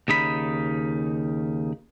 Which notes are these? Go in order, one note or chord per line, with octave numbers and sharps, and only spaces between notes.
D#2 C#3 D#4 B5